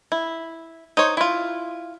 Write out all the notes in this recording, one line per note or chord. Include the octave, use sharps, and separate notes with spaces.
E4
D#4 C5 C#5
E4 F4